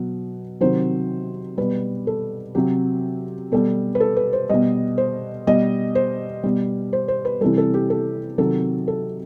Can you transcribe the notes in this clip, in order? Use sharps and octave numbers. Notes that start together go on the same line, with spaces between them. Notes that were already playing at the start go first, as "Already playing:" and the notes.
Already playing: B2 F#3
C3 D#3 F#3 C5
B2 G3 B4
A4
C3 F#3 G4
B2 G3 A4
B4
A4
B4
C5
B2 G3 D#5
C5
B2 G3 D#5
C5
B2 G3
C5
C5
B4
C3 E3 G3 A4
A4
G4
A4
C3 D#3 F#3 A4
A4